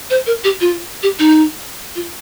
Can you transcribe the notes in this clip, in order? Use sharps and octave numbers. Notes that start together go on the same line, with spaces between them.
C5
A#4
G4
F4
G4
D#4
F4